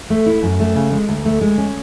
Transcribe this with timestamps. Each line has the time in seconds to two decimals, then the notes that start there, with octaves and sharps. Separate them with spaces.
0.10 A3
0.26 E4
0.43 F#2
0.60 A3
0.76 C#3
0.92 G#3
1.08 D2
1.25 A3
1.41 G#3
1.58 C#4